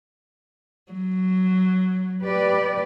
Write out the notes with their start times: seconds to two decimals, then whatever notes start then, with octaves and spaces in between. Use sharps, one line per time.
0.93 F#3
2.22 G4 B4 D5